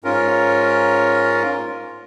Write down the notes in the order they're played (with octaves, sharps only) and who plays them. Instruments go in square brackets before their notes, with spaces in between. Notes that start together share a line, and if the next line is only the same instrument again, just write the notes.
[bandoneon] G#2 C#4 F4 A#4